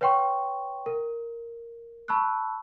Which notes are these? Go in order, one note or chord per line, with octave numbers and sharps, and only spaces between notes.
B4 C#5 F#5 G5 C6 C#6
A#4
A5 B5 C#6 E6 F#6